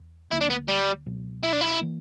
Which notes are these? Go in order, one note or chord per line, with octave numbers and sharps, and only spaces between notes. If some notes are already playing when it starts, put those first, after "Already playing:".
Already playing: E2
D2 C#3 F#3 A#3 E4
D4
B3
G3
C#2 B2 F#3
E4
D4
E4
E3 A#3